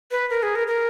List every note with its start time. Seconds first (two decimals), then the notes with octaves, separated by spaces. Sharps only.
0.11 B4
0.30 A#4
0.43 G#4
0.55 A#4
0.67 A#4